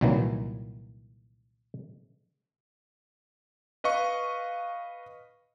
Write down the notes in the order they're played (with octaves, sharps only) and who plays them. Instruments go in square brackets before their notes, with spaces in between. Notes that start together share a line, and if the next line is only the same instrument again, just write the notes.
[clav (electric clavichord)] C2 A#2 D#3 E3 F#3 A#3
[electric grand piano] B4 D#5 F5 C#6